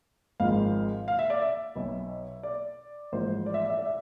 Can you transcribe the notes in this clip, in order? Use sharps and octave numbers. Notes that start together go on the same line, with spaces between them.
G#1 G#2 F3 F5
F5
E5
D5
E5
B1 B2
D5
A1 G#2 F3 C5
D5
E5
D5
E5
D5
E5